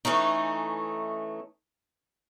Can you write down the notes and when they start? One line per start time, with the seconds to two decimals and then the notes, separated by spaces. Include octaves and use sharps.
0.05 E3 A3 C#4 D#4